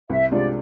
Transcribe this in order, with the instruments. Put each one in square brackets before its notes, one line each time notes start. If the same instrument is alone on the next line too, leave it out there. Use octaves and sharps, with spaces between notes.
[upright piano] C2 [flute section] E5
[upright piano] C3 G#3 D4 F4 [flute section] D5